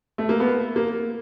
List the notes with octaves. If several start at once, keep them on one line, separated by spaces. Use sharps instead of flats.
A3
A#3
B3
A#3